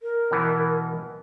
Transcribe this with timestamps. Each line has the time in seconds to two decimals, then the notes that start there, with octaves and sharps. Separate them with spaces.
0.02 A#4
0.31 B2 E3 B3